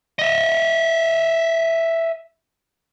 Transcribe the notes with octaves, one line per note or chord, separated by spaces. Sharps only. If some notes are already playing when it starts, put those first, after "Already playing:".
D#5 E5